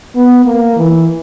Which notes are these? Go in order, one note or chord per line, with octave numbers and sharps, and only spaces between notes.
B3
A#3
E3